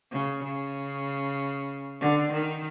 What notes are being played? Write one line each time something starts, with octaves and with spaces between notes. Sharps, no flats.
C#3
C#3
D3
D#3